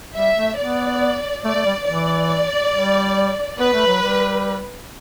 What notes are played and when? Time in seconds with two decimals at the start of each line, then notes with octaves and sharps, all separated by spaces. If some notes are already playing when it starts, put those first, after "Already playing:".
0.16 G3 E5
0.36 A3
0.58 B3 D5
1.44 A3 D5
1.55 A3
1.66 G3
1.87 E3 D5
2.73 G3
3.59 B3 B4
3.74 A3
3.87 F#3
4.02 G3